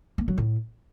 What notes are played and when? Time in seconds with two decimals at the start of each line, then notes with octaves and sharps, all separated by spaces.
0.18 A#3
0.28 F#3
0.38 A2